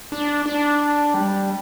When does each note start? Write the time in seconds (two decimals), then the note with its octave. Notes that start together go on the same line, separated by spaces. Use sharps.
0.12 D4
0.46 D4
1.14 G3